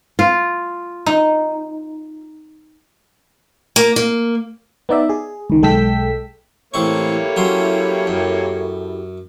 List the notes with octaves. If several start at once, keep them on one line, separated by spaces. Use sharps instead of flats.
F4
D#4
A#3
A#3
B3 D#4 D5 E5
G#4
C#2 D#3
B1 G#3 A4 G5 E6 B6
A1 A#3 C4 E4 G4 A4 C#5 C#6
F#3 C#4 C6
F#2